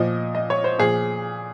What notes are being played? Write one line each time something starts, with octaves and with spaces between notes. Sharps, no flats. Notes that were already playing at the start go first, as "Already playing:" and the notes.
Already playing: A#2 F3 D#5
D#5
C#5
C5
A#2 F3 G#4